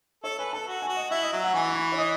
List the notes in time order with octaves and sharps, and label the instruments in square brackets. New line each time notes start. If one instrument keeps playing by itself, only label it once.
[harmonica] A4 [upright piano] C#5
[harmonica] B4 [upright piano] G#5
[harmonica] A4 [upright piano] A5
[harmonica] F#4
[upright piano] G#5
[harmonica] F#4
[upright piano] D#5
[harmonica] E4 [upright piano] E5
[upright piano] D#5
[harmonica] F#3 [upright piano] E5
[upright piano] F#5
[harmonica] E3 [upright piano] G#5
[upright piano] C#6
B5
C#5
D#5